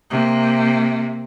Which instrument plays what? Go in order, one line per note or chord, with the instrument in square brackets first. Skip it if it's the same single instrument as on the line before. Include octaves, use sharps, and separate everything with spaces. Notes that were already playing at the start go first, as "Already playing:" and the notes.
[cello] C3 A#3